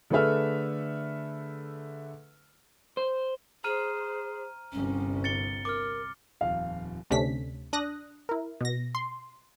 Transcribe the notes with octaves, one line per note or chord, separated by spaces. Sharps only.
D3 A3 G#4 B4 E5 F6
C5
G#4 C5 A#5 F6 D#7
G1 C2 C#4
A6 C#7 G7
A#4 D6 F6
D#1 F2 F5
D2 C3 A3 C#4 D4 B6
D4 D#6 F#6 A#6
E4 A#4
B2 A#6
C6